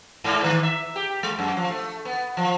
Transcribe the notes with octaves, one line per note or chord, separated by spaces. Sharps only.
G#2
D#3
E5
G4
G#3
F#2
F3
A3
B3
F3